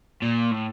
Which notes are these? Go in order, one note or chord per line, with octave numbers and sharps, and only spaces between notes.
A#2
A2